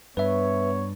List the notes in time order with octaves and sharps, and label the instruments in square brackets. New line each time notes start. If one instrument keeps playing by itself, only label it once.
[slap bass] G2 [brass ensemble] B3 C#5 [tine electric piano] B4 E5